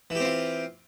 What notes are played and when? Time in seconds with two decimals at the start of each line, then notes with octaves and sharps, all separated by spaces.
0.10 E3
0.15 G4
0.20 C4
0.25 F4